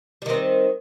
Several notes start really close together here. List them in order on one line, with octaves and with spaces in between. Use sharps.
G3 D#3 C4